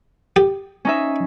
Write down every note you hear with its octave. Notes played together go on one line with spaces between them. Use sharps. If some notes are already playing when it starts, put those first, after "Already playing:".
G4
C#4 D#4 E5